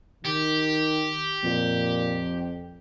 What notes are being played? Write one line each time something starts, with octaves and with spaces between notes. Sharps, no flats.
D#3 G4
F2 A#2